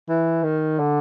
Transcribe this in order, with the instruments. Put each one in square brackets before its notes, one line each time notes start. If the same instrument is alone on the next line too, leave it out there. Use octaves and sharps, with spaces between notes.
[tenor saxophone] E3
D#3
D3